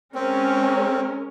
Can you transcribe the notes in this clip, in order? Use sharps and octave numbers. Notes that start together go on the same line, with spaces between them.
G#3 C4 C#4 A#4